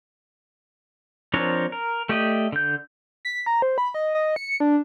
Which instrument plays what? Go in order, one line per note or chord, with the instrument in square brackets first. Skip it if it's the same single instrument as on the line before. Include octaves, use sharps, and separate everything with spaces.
[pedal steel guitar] F3 C4 D4 A#4 C#5
A#4
A3 G4 D5 D#5
D3 G6
[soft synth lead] B6
A#5
C5
B5
D#5
D#5
C#7
D4